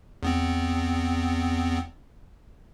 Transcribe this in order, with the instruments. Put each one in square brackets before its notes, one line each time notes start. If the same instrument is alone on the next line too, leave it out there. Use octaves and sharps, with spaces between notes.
[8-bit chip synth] E2 B3 C4